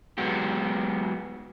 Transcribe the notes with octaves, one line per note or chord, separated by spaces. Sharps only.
F#3 G#3 B3 F#4 G4